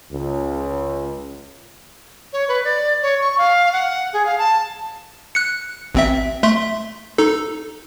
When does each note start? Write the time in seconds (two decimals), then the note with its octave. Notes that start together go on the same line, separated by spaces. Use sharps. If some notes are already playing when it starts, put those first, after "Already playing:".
0.12 C#2
2.33 C#5
2.49 B4
2.64 D5
3.02 C#5
3.21 C#6
3.38 F5
3.73 F#5
4.13 G#4
4.26 F5
4.38 A5
5.35 F#6 C#7
5.95 A1 C4 E5
6.43 A3 E5 C6
7.18 D#4 A4